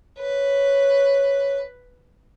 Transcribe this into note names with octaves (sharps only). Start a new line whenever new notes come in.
B4 C#5